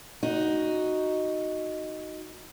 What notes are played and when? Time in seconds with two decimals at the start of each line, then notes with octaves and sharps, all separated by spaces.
0.23 D#4 F#4